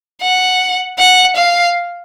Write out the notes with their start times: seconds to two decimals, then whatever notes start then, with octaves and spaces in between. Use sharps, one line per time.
0.22 F#5
0.99 F#5
1.37 F5